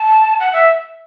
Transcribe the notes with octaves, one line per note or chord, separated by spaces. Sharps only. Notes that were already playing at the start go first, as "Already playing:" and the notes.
Already playing: A5
F#5
E5